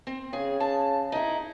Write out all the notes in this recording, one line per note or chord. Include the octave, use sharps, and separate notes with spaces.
C4
C#3 G#4
A5
D#4 E4